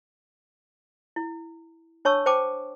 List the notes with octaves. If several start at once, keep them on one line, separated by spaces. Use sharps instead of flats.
E4
D4 C#5 A5 C#6 E6
C5 G5 A5 D6